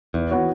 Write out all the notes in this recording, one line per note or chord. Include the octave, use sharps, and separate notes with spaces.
E2 E3
B3 F#4 C#5